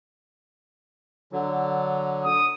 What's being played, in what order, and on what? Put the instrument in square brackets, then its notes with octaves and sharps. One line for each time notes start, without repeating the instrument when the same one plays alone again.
[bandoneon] D3 F#3
[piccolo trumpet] D#6